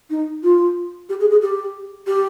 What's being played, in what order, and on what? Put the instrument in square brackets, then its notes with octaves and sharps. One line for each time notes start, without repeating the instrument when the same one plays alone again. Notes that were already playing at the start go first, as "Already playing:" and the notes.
[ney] D#4
F4
G4
G#4
G#4
G4
G4